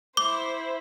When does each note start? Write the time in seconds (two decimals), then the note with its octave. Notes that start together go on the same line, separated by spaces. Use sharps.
0.17 E4 C5 D6